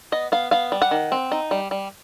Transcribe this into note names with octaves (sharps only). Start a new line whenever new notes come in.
B3 D#5
B3 F5
B3 F5
G3
F#5
D#3
C4
D#4
G3
G3